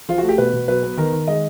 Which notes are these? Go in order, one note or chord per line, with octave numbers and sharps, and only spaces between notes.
F3 F4
F#4
A3
G4
B2 B4
B2
F#3 B4
B3
D#3 A#4
D#3
G#3 D#5